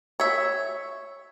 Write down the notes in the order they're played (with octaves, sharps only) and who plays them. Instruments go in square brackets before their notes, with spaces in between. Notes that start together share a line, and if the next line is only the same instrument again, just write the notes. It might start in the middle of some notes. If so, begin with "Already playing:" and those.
[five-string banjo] C#5 E5